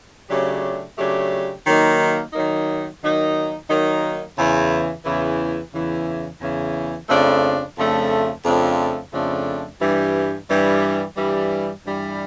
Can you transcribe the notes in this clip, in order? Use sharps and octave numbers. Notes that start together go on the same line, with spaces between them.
C#3 F#3 A3 D4 G4
C#3 F#3 A3 D4 G4
D#3 F#3 A#3 D#4
D#3 F#3 A#3 D#4
D#3 F#3 A#3 D#4
D#3 F#3 A#3 D#4
E2 C#3 E3
E2 C#3 E3
E2 C#3 E3
E2 C#3 E3
F2 C#3 F3 A3 D4
F2 C#3 F3 A3 D4
F2 C#3 F3 A3 D4
F2 C#3 F3 A3 D4
G2 E3 G3
G2 E3 G3
G2 E3 G3
G2 E3 G3